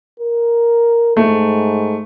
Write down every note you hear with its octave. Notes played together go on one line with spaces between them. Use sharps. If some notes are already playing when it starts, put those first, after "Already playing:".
A#4
G#2 A3